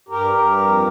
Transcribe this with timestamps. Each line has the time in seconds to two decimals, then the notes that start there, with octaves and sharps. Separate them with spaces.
0.09 G2 G4 A#4
0.34 G2
0.60 F2